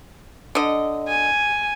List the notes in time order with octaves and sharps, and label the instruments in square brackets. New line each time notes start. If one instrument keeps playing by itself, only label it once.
[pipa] D3 D#5
[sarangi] G#5